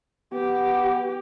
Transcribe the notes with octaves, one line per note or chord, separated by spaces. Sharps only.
B3 G4